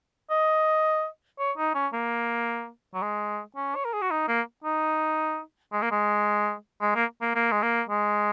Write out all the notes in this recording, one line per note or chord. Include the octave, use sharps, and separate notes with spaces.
D#5
C#5
D#4
C#4
A#3
F#3
G#3
C#4
C#5
A#4
G#4
F#4
D#4
A#3
D#4
G#3
A#3
G#3
G#3
A#3
A#3
A#3
G#3
A#3
G#3